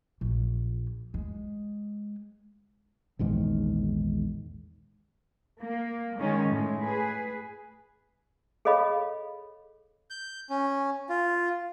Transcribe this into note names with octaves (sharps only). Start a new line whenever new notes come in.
A#1
G#3
A#1 E2 G#2 D#3
A#3
D#3 G#3 C#4 D#4
A2 G#3
G#4 B4
G#4 A4 C#5 D#5 F5 B5
G6
C#4
F4